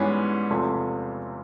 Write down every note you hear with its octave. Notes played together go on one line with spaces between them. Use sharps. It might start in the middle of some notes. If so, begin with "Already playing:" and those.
Already playing: G#2 E3 G3 B3 C#4
E2 C3 F3 A3